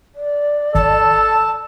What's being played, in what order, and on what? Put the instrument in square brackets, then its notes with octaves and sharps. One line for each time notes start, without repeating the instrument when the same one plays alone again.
[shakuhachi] D5
[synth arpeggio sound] G#1 [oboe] A4 [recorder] A5